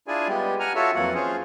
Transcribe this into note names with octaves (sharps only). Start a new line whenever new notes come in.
D4 E4 F4 G#4 D5 G#5
G3 G#3 B3 G4
F#5 G#5 A#5 F6
F4 F#4 A4 C#5 E5
F2 E3 F#3 A#3 F#4 F#5
C#4 F4 G#4 C5